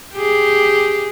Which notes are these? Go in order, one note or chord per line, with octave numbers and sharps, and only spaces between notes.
G4 G#4